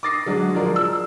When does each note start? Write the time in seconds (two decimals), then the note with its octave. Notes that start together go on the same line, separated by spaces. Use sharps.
0.03 D6 D#6 A6 A#6 C7
0.26 D3 F#3 G#3
0.55 F3 G#3 A#4 D5
0.76 E6